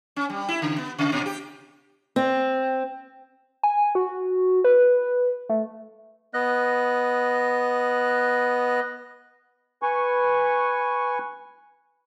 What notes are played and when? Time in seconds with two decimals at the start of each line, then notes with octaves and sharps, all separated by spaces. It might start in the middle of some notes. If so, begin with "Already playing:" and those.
0.16 C#4
0.30 G3
0.49 E4
0.62 C#3
0.78 B3
0.99 C3
1.12 A#2
1.26 G4
2.16 C4
3.63 G#5
3.95 F#4
4.64 B4
5.49 A3
6.34 B3 D#5 F#6
9.83 B4 G#5 C#6